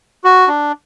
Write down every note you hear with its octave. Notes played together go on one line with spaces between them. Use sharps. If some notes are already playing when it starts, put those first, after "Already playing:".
F#4
D4